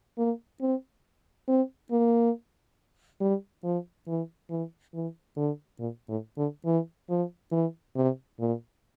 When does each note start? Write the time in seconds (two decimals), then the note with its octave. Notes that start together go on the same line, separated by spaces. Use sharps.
0.18 A#3
0.61 C4
1.48 C4
1.91 A#3
3.21 G3
3.64 F3
4.07 E3
4.50 E3
4.94 E3
5.36 D3
5.80 A#2
6.09 A2
6.37 D3
6.66 E3
7.10 F3
7.52 E3
7.96 C3
8.39 A#2